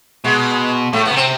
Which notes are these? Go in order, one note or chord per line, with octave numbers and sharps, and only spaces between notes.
B2 G#3
A2 A3
B3
C3
C4